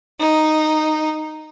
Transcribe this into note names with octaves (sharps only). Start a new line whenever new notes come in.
D#4